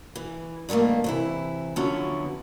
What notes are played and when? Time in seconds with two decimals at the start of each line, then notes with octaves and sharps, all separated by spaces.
0.16 E3
0.69 G2 D#3 G3 A3 A#3
1.04 C3 E3 E4
1.76 D3 F3 F#3 B3 C#4 E4